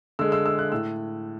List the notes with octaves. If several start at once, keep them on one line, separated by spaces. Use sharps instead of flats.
D3 G#3 E6
E6
E6
F#6
A2 E6